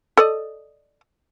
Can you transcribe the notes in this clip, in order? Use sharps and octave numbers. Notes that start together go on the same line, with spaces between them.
A4 D5 D#5